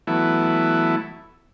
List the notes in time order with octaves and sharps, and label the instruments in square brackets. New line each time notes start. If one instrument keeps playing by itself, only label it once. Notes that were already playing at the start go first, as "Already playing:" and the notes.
[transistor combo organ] E3 F#3 A3 B3 E4